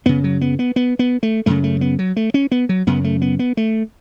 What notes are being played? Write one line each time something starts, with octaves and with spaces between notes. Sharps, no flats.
F#2 C#3 B3
F#3
B3
B3
B3
B3
A3
F#2 C#3 A3
A3
B3
F#3
A3
C#4
B3
F#3
F#2 C#3 B3
A3
B3
B3
A3